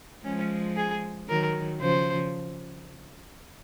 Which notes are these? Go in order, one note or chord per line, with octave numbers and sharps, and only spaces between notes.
F3 G#3 C#4
G#4
D#3 F#3 A#4
C#3 F3 C5